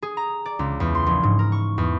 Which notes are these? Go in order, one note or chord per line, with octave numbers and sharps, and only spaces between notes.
G#4
A#5
D5
C#2
E2
C6
A#1
G#2
A#4
C#6
E2